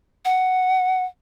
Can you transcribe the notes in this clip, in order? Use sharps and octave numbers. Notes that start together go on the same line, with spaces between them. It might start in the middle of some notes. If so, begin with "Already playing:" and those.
F#5